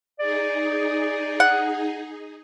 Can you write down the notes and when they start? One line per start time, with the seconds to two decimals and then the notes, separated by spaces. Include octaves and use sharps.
0.19 D#4 G#4 D5
1.40 F#5